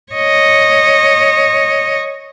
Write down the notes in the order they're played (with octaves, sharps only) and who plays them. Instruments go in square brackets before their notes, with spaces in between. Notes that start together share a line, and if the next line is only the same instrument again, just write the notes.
[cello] C#5 D#5